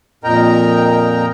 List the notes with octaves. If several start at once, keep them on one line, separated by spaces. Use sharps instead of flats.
F2 A#2 A#4 D#5 G5 A#5